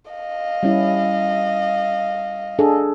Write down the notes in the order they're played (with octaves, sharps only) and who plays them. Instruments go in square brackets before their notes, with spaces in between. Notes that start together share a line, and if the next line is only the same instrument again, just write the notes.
[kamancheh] D#5 F5
[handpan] G3 C#4 E4
D4 G#4 A4